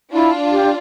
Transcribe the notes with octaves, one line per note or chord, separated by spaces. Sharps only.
D4 E4 F4
G4